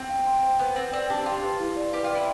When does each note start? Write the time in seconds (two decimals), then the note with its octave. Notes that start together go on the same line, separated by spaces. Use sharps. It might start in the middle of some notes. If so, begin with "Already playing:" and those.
Already playing: C4
0.09 F5
0.26 C6
0.43 C5
0.59 B3 B4
0.76 C4 B4
0.93 C4 D5
1.10 D4 G4
1.26 F4 G4
1.44 B4
1.59 E4
1.76 D5
1.93 G4 B4
2.04 F4
2.10 D5
2.15 E4